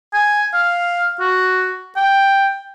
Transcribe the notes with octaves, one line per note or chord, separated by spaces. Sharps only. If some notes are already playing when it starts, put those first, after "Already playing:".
G#5
F5
F#4
G5